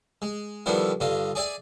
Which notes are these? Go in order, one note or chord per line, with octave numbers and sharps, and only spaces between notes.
G#3
D3 D#3 F3 G3 B3 E4
G2 D3 F4 D#5
G#4 D5 E5 G#5